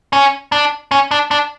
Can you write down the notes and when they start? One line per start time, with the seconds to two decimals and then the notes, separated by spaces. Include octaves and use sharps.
0.13 C#4
0.52 D4
0.91 C#4
1.11 D4
1.31 D4